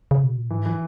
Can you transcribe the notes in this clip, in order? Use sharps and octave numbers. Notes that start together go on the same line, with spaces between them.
C#3
B2
A#2
G#2 E3
E3